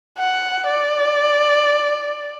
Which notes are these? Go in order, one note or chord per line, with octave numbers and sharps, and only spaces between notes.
F#5
D5